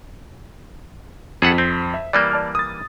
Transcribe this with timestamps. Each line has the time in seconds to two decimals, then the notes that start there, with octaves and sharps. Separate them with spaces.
1.42 F2 G#4 A4 F#5 B6
1.58 C4
1.94 E5
2.13 E3 G3 A#3 D5
2.32 D5 A5 F6
2.55 D#6 A6